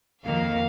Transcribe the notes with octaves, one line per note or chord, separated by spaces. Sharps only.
F2 D#3 A#3 F5